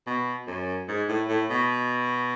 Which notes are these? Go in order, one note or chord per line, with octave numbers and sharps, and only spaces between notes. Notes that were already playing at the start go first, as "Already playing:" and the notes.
B2
F#2
G#2
A2
A2
B2